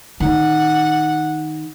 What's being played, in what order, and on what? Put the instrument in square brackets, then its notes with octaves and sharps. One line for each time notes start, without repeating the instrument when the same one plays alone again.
[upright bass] D#3 [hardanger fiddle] F#5